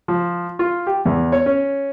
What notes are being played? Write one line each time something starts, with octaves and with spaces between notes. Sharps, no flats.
F3
F4
G4
E2
C#5
C#4